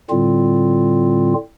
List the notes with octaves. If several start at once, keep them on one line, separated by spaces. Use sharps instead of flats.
A2 D3 G3 C4 F4